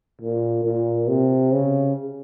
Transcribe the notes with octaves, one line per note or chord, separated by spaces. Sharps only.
A#2
A#2
C3
C#3